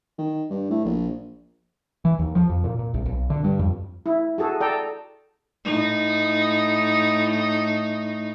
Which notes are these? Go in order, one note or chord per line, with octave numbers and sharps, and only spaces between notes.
D#3
G2
A2
A#1
E3
D#2
F3
F2
A#2
A#2
C2
B1
D3
G2
F2
E4
F#4 G#4 A4
A4 D5 G5 A#5
A2 D#4